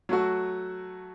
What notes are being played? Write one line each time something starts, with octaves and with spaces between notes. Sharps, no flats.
F#3 A3 F#4